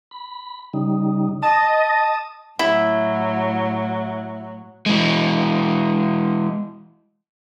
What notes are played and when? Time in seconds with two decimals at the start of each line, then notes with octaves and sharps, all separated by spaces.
0.11 B5
0.74 C#3 G3 D#4
1.43 D#5 A5 D#6
2.59 A2 F#3 E4
4.86 E3 G#3